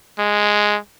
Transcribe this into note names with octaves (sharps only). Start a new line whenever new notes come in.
G#3